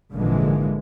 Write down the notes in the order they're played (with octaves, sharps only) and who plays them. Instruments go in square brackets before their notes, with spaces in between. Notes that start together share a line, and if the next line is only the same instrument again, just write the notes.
[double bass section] G#1 A#2 D3 E3 F3 G#3